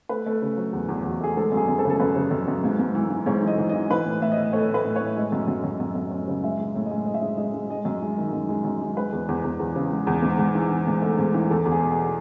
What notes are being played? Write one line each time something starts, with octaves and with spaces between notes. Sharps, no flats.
A3 B4
A3
C#3
F#3
E2
E2
E2
F#4
A3 G#4
G#3 A4
F#2
G#4
F#2
A4
C#3
A4
F#2 B4
C#3
F#2
F#2
G#2
G#2
E3
E3
G#2 C#5
E3 D#5
G#2
E3 D#5
E3 B4
A2
A2 E5
D#5
E3
A3 C#5
A2 B4
A2
C#5
A2
G#3 D#5
F#2
F#2
F#2
F#2
F#2
F#2
C#3
G#3 E5
G#3
A2
D#5
G#3
A2 D#5
E5
G#3 D#5
G#3 D#5
G#3
G#3 D#5
F#2
G#3
D#3
F#2
G#3
F#2
G#3
G#3 B4
E2
E2
E2
E2
C#3
G#3
E2
G#2
G#2
E3
E3
G#2
A3
G#2
E3
E2 A4
E2
G#4
B2
G#4